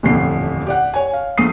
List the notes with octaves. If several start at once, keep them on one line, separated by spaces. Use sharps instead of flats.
D#1 A1 F2 D3 A3 C7
G4 D5 F#5
C#5 G#5
F5
A#1 A3 D#6 C7